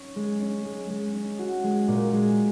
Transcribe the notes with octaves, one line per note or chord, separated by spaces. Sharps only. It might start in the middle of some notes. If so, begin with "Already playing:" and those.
Already playing: C#4
G#3
C#4
G#3
G#3
C#4
F#4
G#3
A#2
G#3